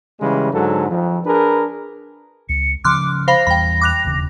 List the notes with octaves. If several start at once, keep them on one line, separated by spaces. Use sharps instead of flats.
C#3 E3 G3 G#3
G#2 D3 F#3 A4
F2
D4 G#4 A#4 B4
C#2 C#7
C#3 F3 C#4 C6 D6 F6 F#6
C5 F5 B5 A#6
E2 E3 G3 G5 B5
D6 F#6 F7
E1 D#2 C#3